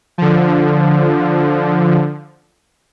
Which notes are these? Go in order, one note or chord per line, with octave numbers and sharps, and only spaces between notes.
D3 F3